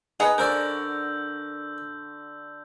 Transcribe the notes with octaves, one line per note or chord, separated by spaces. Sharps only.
D#4 G#4 B4 D#5 F#5
D3 F#4 A#4 C5 D5 E6 G6